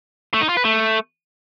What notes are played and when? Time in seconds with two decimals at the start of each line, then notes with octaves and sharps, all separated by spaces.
0.34 A3
0.41 D#4
0.49 F4
0.57 B4
0.65 A3